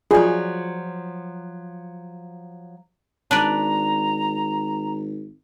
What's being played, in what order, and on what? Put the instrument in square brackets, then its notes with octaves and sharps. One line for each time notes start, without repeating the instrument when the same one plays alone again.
[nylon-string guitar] F3 F#3 [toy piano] F4 D5 F5 [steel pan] G#4
[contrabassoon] G#1 [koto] D4 B4 D5 [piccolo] A#5